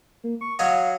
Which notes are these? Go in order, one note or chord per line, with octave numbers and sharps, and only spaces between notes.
A#3
C#6
F#3 C#5 D#5 F5